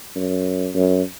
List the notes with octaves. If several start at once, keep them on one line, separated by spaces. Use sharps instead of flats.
F#2
F#2